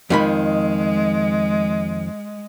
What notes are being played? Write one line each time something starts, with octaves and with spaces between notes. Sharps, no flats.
F2 D#3 G#3 B5